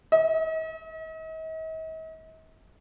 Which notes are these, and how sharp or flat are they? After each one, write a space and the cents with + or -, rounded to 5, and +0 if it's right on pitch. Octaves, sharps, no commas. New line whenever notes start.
D#5 +45